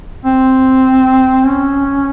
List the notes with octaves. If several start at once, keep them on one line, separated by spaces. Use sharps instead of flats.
C4
C#4